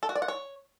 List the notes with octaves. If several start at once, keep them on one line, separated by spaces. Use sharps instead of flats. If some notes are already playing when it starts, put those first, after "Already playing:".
A4
F#4
D5
F#5
C#5